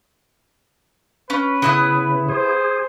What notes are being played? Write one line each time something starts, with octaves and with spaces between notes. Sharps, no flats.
C#4 B4
C#3 B3 E4 D#6
G#4 C5